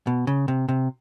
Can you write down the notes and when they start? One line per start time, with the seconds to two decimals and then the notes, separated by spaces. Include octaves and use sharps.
0.07 B2
0.27 C#3
0.48 C3
0.69 C3